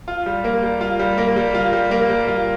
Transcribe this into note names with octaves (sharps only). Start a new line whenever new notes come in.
F4
G3
A#3
G3
F4
G3
A#3
G3
F4
G3
A#3
G3
F4